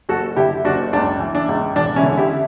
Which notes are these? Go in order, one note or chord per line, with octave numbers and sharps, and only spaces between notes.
F#1 F#4 A4
D3 E4 G4
F#1 D4 F#4
C#2 D4
E3
D4
C#2
E1 D4
C#4 E4
D3
E4 G4